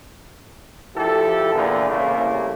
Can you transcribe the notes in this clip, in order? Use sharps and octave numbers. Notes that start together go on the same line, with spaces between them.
D2 F3 E4 G4 A4
E2 A#2 D3
C2 A2 C#3 G3 A3 A#3